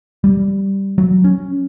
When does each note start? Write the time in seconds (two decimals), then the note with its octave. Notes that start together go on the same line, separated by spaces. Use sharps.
0.24 G3
0.98 F#3
1.24 C#4